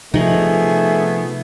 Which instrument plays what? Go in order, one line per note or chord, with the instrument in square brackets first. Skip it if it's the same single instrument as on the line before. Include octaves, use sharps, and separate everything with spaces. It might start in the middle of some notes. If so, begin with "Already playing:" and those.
[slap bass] C3 F3 [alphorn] A3 [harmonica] B3 G#4 [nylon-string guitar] D#4